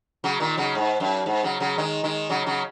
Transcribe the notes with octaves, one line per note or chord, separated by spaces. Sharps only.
C#3 F#3
A#2 D#3
C#3 F#3
G#2
F#2
G#2
C#3 F#3
C#3 F#3
D#3 G#3
D#3 G#3
C#3 F#3
C#3 F#3